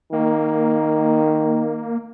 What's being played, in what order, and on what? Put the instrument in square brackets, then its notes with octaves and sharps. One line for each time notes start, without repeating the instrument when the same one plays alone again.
[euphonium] D#3 [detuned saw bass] A#3